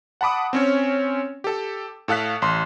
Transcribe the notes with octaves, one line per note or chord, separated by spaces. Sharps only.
F#5 A5 B5 D6 D#6
C4 C#4 C#5
G4 A4
A2 A4 F5 F#6 B6
A1 C6